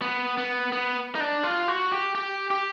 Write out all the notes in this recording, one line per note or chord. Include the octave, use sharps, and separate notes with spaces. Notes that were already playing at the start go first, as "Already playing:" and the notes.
B3
B3
B3
D#4
D4
F4
F#4
G4
G4
G4